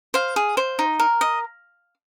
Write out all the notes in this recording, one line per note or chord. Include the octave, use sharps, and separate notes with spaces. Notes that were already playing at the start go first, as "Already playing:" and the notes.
C5 F5
G#4
C5
D#4
A#4
D#5